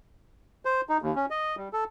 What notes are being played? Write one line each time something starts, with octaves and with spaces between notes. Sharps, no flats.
C5
D#4
D#2
C#4
D#5
G3
A4